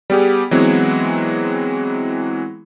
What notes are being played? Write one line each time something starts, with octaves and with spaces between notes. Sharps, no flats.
G3 B3 G4 G#4
E3 F#3 G#3 B3 C4 E4